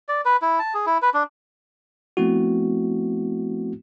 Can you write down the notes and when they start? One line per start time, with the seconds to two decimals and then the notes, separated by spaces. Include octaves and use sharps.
0.09 D5
0.25 B4
0.42 E4
0.59 A5
0.74 G#4
0.86 E4
1.02 B4
1.14 D4
2.17 F3 A3 B3 C4 E4 F#4